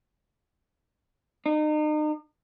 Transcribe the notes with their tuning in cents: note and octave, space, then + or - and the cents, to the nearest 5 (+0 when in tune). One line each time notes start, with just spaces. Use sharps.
D#4 -35